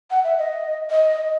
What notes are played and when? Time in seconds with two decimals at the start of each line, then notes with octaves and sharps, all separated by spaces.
0.11 F#5
0.24 E5
0.38 D#5
0.90 D#5